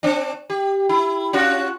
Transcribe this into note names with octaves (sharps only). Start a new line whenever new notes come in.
C4 D4
G4
E4
C#4 F4 F#4